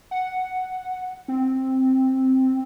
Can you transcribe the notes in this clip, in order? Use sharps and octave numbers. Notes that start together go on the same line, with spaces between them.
F#5
C4